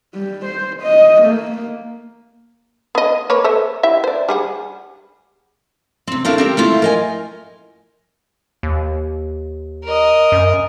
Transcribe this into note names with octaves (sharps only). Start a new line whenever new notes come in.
G3
C5
D#5
A#3
B3 D#5
A#3 B4 C#5
A4 C5 E5
E4 G4 E5
C5 D5
G3 G#4 F#5
C3 C4
A3 A#3 D4 E4 A#4 F5
C4 G4 A#4
A3 E4 F4
A#4 D#5 G#5
D#2
A#4 D#5
F#2